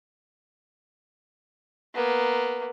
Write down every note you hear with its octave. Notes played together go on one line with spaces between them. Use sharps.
A#3 B3